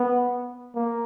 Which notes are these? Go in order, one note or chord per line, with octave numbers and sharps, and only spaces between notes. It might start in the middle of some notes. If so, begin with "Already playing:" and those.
Already playing: B3
A#3